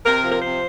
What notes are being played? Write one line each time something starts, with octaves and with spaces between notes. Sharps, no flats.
C3 A#4
F3
A#4
C3 C5